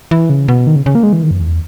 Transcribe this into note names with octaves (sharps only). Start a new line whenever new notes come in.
E3
C#3
B2
D#3
C#3
C#3
A#3
G#3
E3
D#3
F#2
E2